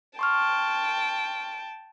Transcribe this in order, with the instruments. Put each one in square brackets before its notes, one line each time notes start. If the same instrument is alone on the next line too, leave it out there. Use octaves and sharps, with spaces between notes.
[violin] G5 A5 [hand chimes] C6 C#6 F6